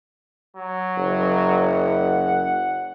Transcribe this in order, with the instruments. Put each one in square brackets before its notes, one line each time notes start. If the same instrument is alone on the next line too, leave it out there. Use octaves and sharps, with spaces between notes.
[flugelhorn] F#3
[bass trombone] F#1
[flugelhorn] F#5